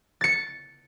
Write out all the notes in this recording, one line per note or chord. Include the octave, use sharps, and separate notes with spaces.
A6 C#7